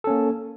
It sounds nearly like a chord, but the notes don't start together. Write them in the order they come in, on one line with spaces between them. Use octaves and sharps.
A4 C#4 A#3